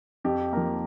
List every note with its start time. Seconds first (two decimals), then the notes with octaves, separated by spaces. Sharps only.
0.24 F2 G4
0.52 F3 A#3 A#4